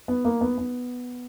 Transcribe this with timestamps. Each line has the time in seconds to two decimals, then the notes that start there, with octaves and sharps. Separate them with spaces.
0.08 B3
0.25 A#3
0.41 B3
0.58 B3